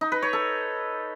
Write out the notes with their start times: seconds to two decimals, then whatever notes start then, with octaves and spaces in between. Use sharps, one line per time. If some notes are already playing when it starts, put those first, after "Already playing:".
0.01 D#4
0.12 B4
0.22 C#5
0.33 A4